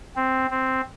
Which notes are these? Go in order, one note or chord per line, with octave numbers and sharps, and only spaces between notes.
C4
C4